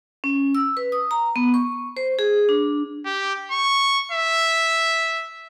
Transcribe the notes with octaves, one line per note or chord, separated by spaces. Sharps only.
C#4
E6
B4
D#6
A#5
B3
C#6
C5
G#4
D4
G4
C#6
E5